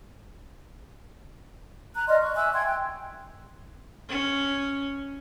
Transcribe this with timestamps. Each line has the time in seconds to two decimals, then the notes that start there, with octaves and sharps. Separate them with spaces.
1.96 A#5 F#6
2.07 D5 D#5 C6 F6
2.20 C#6
2.35 E5 G#5 E6 F#6
2.52 F#5 G5 C6 G#6
2.65 G5
4.09 C#4